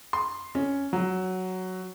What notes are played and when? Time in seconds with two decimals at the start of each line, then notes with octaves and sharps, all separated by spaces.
0.13 C6
0.55 C#4
0.93 F#3